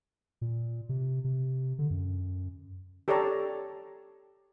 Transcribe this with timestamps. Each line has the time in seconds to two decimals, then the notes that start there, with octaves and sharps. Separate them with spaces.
0.41 A#2
0.89 C3
1.24 C3
1.79 D3
1.90 F#2
3.08 G4 A4 C#5 D5 A5 A#5